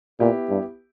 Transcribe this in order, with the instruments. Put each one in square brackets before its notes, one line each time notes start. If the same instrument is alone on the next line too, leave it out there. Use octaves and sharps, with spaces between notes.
[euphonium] A#2 [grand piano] B3 E4 G4
[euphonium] G2